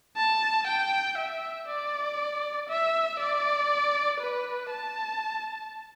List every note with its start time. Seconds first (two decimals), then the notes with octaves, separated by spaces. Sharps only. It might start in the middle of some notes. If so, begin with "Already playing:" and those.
0.17 A5
0.67 G5
1.18 E5
1.68 D5
2.69 E5
3.19 D5
4.20 B4
4.70 A5